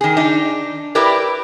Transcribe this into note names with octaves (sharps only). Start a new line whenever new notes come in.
D#3 G#4
D4 D#4
E4 G4 A#4 B4 D5